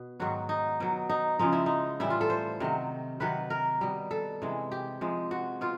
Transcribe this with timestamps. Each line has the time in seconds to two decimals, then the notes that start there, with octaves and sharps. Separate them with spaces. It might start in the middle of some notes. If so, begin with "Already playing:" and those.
Already playing: B2
0.20 G#2 D#3 F#3 F#4
0.49 D#4
0.80 B2 F#3
1.09 D#4
1.39 C#3 F3 G#3 D#4
1.53 E4
1.66 D#4
2.00 A2 E3 G3 E4
2.10 F4
2.21 A4
2.30 C5
2.60 C3 D#3 F#3
3.20 C3 D#3 F#3 B4
3.50 A#4
3.81 B2 G3
4.11 A4
4.42 C3 E3 G#3
4.72 G4
5.01 C3 F3 G#3
5.31 F#4
5.61 B2 F4